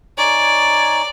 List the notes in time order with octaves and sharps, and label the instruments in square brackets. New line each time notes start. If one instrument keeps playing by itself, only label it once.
[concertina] D#4 C#5 G#5 [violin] D5